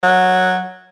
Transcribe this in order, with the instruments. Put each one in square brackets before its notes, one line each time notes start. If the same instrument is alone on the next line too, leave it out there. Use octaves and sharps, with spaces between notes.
[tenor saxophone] F#3